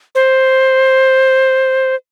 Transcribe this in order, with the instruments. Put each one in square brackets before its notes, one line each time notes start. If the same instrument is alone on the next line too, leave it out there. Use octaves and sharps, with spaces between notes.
[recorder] C5